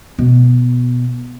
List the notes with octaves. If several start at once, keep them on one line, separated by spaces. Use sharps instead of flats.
B2